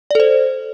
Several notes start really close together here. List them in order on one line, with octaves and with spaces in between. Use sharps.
D5 A4 C5